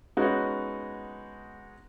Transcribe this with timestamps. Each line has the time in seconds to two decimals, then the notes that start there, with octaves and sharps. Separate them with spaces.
0.17 G#3 B3 C#4 D#4 F#4